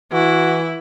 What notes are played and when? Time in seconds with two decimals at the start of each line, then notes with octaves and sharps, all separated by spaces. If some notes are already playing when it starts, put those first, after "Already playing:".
0.13 E3 E4 F#4